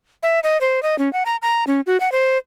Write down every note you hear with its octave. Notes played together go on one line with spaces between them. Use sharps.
E5
D#5
C5
D#5
C#4
F#5
A#5
A#5
C#4
F#4
F#5
C5